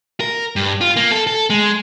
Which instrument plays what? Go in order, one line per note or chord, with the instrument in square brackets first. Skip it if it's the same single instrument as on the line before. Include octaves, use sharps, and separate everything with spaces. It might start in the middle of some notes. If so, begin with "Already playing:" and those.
[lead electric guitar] A#4
G2
F4
A#3
A4
A4
G#3